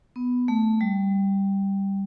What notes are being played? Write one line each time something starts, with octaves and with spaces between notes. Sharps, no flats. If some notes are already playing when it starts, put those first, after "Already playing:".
B3
A3
G3